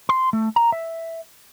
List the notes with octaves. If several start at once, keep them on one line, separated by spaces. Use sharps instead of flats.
C6
A3
A#5
E5